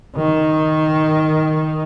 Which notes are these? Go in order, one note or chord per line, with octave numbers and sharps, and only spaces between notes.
D#3